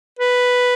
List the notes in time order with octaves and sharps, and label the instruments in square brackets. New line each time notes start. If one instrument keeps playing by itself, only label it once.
[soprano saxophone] B4